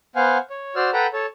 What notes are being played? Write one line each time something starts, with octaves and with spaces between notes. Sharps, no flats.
B3 C5 F5 F#5 G#5
C#5
F#4 C5 D5 E6 F6
A4 B4 F#5 G5 A#5 B5
A4 C#5